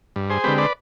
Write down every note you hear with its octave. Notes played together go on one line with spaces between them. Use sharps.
G2
G#4 C5
D3 G#3 C4 G4 B4
B4 D5